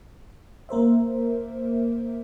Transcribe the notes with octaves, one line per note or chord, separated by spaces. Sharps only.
A#3 A#4 C5 E5